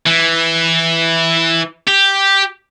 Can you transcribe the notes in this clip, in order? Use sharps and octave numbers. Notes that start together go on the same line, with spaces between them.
E3
G4